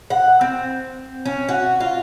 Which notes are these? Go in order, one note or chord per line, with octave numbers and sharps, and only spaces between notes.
F#5
C4
C#4
F#4
F4